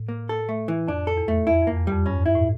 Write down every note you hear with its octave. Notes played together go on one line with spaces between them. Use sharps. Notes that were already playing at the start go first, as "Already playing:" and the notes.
Already playing: A2
A#3
A4
A3
E3
F2 D4
A4
E2
A3
F2 E4
F2 A#3
E2
F2 G3
G2 C#4
E4
A2